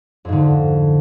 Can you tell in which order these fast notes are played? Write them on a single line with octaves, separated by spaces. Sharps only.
F2 G#2 D3